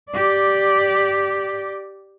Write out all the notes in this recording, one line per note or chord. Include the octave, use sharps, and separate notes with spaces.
G4 D5